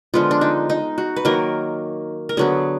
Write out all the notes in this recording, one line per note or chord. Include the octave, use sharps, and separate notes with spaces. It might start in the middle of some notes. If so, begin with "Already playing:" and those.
D3 F3 G#3 B3 F4
D4
D#4
D#4
F#4
B4
D#3 F#3 A#3 A#4
A#4
D3 F#3 B3 G#4